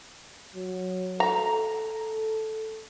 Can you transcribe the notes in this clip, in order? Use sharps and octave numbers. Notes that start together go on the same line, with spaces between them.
F#3
A4 A#5